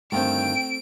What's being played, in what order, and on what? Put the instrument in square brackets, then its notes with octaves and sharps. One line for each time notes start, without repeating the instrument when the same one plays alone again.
[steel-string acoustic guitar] D2 G2 D#3 [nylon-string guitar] A3 C4 [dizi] G5 [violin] D7